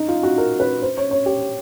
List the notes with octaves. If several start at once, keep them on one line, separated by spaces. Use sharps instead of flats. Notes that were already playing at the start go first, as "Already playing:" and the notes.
Already playing: D#4
F4
F#4
A#4
B4
C5
C#5
C#5
G4